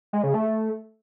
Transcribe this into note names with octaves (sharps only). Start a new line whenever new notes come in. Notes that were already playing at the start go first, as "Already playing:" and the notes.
G#3
C#3
A3